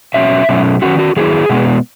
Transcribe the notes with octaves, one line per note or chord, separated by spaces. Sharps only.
B2 F#3 C#4 E5
B2 F#3 C#4
D#3 F#3 C#4 E4 F#4
F#4
D#3 F#3 C#4 E4 G#4
B2 G#3 B3